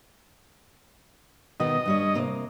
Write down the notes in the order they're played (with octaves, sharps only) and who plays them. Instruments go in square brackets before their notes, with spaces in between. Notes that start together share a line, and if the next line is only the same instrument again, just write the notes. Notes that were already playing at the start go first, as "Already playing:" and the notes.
[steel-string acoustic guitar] B2 D#3 B3 [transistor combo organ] D#5
[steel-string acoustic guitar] G2 G3 C#5
C3 A#3